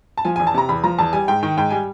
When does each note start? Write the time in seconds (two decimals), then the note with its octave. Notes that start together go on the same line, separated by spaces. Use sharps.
0.18 A5
0.25 F3 G#5
0.36 E2 G#5
0.47 A5
0.54 C3 A#5
0.69 E2 B5
0.84 F3 A#5
0.98 E2 A5
1.13 G3 G#5
1.28 G#2 G5
1.43 D#3 G5
1.57 G#2 G5
1.71 G3 G#5